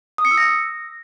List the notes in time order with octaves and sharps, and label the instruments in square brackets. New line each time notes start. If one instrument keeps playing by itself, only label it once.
[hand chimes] D#6
C#7
E6
A#6